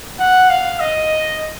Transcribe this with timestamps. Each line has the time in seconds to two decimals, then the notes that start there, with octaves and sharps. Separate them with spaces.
0.20 F#5
0.50 F5
0.80 D#5